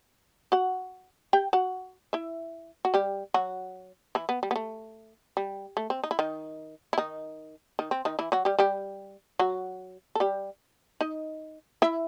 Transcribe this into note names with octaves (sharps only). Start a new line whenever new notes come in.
F#4 F#5
G4 G5
F#4 F#5
E4 E5
F#4
G3 G4
F#3 F#4
E3 E4
B3
G3
B3
A3
G3
A3
C4
D#4
E4
D#3 D#4
E4
D#3 D#4
D#3 D#4
C4
D#3 D#4
E3 E4
F#3 F#4
G3 G4
G3 G4
F#3 F#4
A4
G3 G4
D#4 D#5
E4 E5